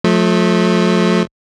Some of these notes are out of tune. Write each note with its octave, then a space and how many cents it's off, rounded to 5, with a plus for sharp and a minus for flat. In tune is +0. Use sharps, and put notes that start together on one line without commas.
F3 +30 A3 -20